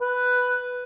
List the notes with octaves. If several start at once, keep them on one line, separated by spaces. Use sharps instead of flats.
B4